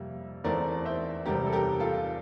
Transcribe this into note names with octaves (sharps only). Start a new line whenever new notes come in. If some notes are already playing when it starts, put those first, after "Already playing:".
Already playing: F2 C3 G3 A#3 E5
E2 E3 A3 C4 A#4 D5
C5 E5
E2 C3 G3 G4 A#4
A4
G4 A#4
F4 A4